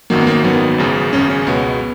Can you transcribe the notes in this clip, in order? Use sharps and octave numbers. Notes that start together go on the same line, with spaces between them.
G#1 F#2 D#3 F#3 A#3
B3
A#3
G#1 F#2 D#3 F#3 B3
G#1 F#2 C#3
G#1 F#2 C#3 C#4
C#4
C#2 B2 G#3 B3